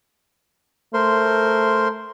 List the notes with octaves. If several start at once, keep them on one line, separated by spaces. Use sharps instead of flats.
A3 A#4 C5 C6